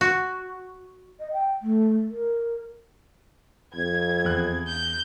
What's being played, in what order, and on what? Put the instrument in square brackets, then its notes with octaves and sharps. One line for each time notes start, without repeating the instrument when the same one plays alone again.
[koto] F#4
[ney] D#5
G5
A3
A#4
[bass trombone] F2 [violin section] G#6
[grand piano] E2 F#6
[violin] G6